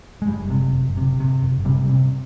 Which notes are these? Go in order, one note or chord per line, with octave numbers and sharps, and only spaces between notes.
G#3
F#1 G3
C3
F#1
C3
C3
F#1
C3 G3
C3